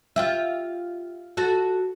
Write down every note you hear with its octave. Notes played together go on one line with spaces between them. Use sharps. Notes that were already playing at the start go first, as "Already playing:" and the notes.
F4 G4 E5
F#4 A4